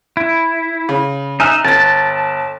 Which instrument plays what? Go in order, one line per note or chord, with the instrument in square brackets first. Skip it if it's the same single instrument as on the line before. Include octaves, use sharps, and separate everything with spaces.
[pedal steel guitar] E4
[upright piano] C#3
[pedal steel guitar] D#4 E5 [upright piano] G#5 F6 F#6
[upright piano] G1 A6 [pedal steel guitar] A5